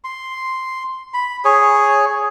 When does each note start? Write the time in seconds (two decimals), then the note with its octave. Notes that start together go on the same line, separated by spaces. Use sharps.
0.04 C6
1.14 B5
1.45 G#4 C#5